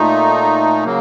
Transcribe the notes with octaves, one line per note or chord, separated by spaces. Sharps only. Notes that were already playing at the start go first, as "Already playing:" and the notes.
Already playing: A#2 A3 D#4
C#3 F#3 A#3